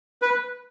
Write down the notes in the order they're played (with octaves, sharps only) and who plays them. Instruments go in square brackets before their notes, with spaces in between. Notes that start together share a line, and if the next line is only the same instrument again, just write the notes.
[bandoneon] B4